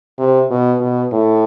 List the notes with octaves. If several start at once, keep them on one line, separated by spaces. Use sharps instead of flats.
C3
B2
B2
A2